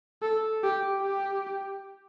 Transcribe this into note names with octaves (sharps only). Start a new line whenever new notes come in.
A4
G4
G4